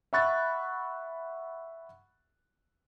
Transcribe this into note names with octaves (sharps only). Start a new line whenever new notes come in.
E5 F#5 B5 C#6 F#6 A6